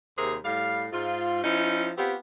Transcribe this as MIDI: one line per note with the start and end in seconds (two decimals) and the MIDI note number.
0.18 0.36 39
0.18 0.36 48
0.18 0.36 68
0.18 0.36 70
0.18 0.36 72
0.45 0.86 45
0.45 0.86 55
0.45 0.86 77
0.92 1.42 44
0.92 1.42 65
1.44 1.91 53
1.44 1.91 61
1.44 1.91 63
1.44 1.91 64
1.97 2.15 59
1.97 2.15 60
1.97 2.15 65
1.97 2.15 67